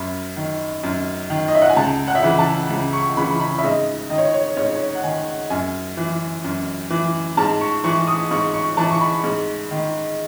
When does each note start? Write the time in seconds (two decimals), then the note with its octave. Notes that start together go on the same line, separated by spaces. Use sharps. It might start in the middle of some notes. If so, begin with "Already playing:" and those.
Already playing: F#2 B5
0.37 D#3
0.83 F#2
1.30 D#3
1.48 D#5
1.55 E5
1.62 F#5
1.69 G#5
1.76 C#2 A5
2.08 F#5
2.15 E5
2.22 C#3 E3 F#5
2.39 A5
2.70 C#2
2.93 C#6
3.16 C#3 E3 B5
3.40 B5
3.58 E5
3.64 G#2 D#5
4.10 D#3 D#5
4.18 C#5
4.34 C#5
4.57 G#2 C#5
4.75 C#5
4.95 F#5
5.03 D#3 G#5
5.50 F#2 G#5
5.97 E3
6.44 F#2
6.90 E3
7.37 G#2 A5
7.61 C#6
7.84 E3 C#6
8.07 D#6
8.31 G#2 C#6
8.54 C#6
8.77 E3 A5
8.91 C#6
9.01 B5
9.24 G#2
9.71 D#3